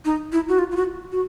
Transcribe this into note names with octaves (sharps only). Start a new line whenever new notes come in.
D#4
E4
F#4
F4
F4
F#4
F#4